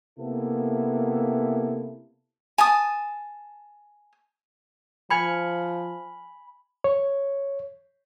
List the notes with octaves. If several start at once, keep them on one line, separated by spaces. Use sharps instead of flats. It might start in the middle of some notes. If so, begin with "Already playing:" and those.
C3 A#3 B3 E4 A4
G#5 A5 D#6
F3 G#5 B5 F6 C#7
C#5